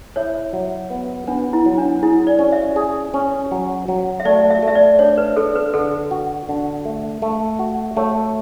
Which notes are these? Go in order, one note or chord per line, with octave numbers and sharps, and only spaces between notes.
E4 C#5
F#3
B3
B3 D4
E4
F#3
D4
E4 G#4
D5
C#4
E5
G#4
C#4
F#3
F#3
E5
A3 D5
E5
A3
E5
D5
D4 C#5
B4
D4 A4
B4
D3 A4
F#4
D3
A3
A3
F#4
A3 C#5